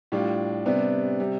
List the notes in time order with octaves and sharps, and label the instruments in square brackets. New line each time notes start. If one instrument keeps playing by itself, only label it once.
[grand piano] A2 G3 D4 F4
C3 G3 B3 D4
C3 G3